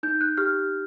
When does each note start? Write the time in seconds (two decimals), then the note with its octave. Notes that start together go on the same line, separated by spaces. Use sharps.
0.03 D#4 G6
0.21 F#6
0.37 G4 F6